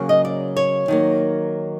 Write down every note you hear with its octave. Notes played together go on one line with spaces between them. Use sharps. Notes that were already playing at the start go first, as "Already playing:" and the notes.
Already playing: C#3 F#3 A#3
D#5
D5
C#5
D#3 F#3 A#3